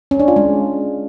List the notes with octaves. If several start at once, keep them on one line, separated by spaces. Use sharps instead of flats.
C#4
D4
F4
G#3